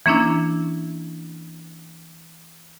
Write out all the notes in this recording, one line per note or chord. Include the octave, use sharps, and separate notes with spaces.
E3 A#3 C#4 D4 E4